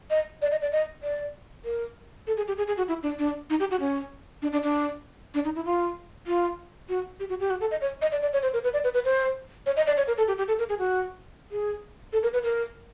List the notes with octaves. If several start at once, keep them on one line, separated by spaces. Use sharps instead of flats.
D#5
D5
D#5
D5
D#5
D5
A#4
A4
G#4
G4
G#4
G#4
F#4
E4
D4
D4
D#4
G4
F#4
C#4
D4
D4
D4
D4
D#4
E4
F4
F4
F#4
G4
F#4
G4
F#4
A4
D#5
C#5
D#5
D5
D5
C#5
C5
A#4
B4
D5
B4
B4
C5
C#5
D#5
D5
C#5
A#4
A4
G4
G4
A4
A#4
G#4
F#4
G#4
A4
A#4
B4
A#4